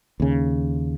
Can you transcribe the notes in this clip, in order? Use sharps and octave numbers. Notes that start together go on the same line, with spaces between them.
D#2 C#3